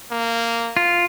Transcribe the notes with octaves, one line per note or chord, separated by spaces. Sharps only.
A#3
F4